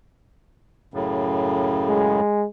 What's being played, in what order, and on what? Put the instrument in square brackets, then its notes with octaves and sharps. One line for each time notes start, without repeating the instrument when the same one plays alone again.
[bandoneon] F#2 A2 C#3
[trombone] G#3